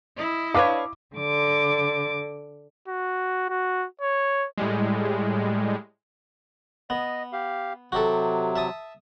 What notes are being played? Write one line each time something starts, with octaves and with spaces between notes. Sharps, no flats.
E4 D#5
D4 B4 C#5 F5 D6
D3 D6
F#4
F#4
C#5
A2 G3 G#3
B3 D#5
G4 F5
C3 F#3 F#4 G4 A4
E5 A5 D#6